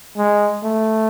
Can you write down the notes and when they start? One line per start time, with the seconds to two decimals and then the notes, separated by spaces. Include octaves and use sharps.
0.17 G#3
0.64 A3